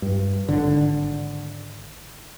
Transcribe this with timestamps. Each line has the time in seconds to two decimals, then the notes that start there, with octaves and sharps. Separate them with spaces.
0.02 G2
0.49 G#1 D3